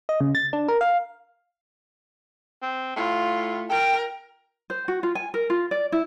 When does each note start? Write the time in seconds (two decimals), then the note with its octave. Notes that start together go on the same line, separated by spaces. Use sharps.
0.09 D#5
0.20 C#3
0.35 A6
0.53 D4
0.68 A#4
0.81 F5
2.63 C4
2.96 A2 F4
3.69 A#4 G5
4.70 C5
4.88 F#4
5.03 F4
5.15 G#5
5.34 A#4
5.50 F4
5.71 D5
5.92 E4